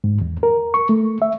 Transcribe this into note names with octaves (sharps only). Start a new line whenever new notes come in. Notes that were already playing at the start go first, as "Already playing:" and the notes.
G#2
E2
A#4
C#6
A3
E5